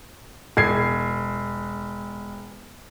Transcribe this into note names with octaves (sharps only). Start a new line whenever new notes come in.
E1 G#6 C7